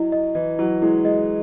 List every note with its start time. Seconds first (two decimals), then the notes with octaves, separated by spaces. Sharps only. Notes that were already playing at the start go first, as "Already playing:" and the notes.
Already playing: F#3 E4 D#5
0.12 D#5
0.35 E3 D#5
0.58 F#3 E4
0.82 G#3 E4
1.04 G#3 D#5